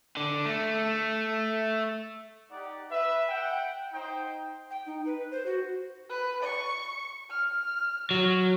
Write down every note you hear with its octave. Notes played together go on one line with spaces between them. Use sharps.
D3
A3
D#4 G4 D5 F#5
B4 E5
F#5 G5
D#4 C5 G5
G5
D#4
B4
C5
F#4
B4
C#6
F6
F#3